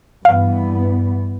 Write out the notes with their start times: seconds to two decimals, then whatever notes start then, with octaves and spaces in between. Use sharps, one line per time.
0.24 G2 E3 B3 F5